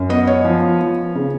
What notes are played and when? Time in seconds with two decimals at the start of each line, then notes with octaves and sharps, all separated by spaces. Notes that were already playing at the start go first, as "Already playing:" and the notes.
Already playing: F#2
0.09 B3 D#5
0.27 C#5
0.45 F3
0.81 F3
1.15 C#3